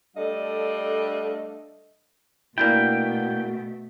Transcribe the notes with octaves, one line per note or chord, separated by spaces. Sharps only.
G3 A3 D4 A4 D#5 F5
B2 A3 A#3 D4 E4 F#4 G5